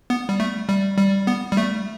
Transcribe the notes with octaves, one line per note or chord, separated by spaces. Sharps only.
B3
G3
A3
G3
G3
B3
G3
A3